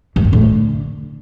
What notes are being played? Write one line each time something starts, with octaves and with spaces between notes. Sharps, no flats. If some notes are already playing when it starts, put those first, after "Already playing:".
G2
F#2
A2
D3